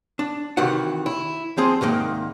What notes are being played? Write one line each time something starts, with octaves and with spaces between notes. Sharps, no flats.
D4
C3 D#3 E3 F#4 F#5
E4
F3 C4 G#4
C2 G#2 D#3 A#3